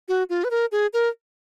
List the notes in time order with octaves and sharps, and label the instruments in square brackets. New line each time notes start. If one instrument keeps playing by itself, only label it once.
[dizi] F#4
F4
B4
A#4
G#4
A#4